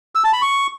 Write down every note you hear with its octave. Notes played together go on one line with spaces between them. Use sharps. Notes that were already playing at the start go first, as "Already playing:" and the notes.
E6
A5
B5
C#6